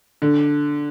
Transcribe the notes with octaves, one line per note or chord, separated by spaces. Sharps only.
D3